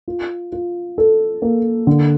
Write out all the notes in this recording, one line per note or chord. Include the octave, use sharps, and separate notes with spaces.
F4
F4
A4
A#3
D3